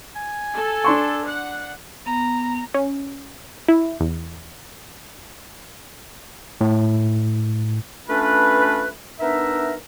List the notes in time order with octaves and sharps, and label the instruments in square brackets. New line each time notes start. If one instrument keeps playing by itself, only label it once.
[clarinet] G#5
[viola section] A4
[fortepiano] D4 C6 C#6
[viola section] F#5
[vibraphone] B3 [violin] A#5
[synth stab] C#4
E4
E2
[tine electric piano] A2
[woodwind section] A3 C#4 D4 F4 B4
B3 D4 D#4 A#4 E5